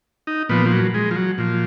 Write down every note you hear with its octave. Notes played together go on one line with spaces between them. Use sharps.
D#4
A#2 F3 B3
F3
F#3
G#3
F3
F#3
A#2 F3